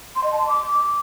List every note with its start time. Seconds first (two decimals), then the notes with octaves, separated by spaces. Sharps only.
0.16 C6
0.24 D#5
0.32 A5
0.40 C6
0.48 D6